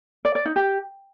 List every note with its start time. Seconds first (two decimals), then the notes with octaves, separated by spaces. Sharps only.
0.25 D5
0.35 D5
0.45 D#4
0.56 G4